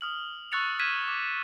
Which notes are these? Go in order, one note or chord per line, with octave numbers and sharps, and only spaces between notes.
D#6 F6 F#7
C#6 E6 F#6 A6 C#7 F7
F6 F#6 G#6 B6 D#7 E7
D6